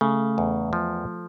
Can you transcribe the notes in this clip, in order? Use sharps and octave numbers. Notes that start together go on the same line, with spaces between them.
C#3 A3
E2
F3